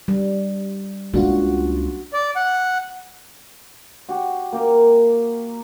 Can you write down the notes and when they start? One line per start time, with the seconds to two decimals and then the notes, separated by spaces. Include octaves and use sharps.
0.08 G3
1.14 C#2 A#3 C#4 D4 F4 F#4
2.13 D5
2.36 F#5
4.09 F#4 G4
4.53 A#3 G4 A#4